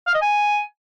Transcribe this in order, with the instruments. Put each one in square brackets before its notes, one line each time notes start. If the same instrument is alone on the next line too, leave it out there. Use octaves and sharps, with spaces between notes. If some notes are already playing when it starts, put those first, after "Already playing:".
[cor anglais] F5
D#5
G#5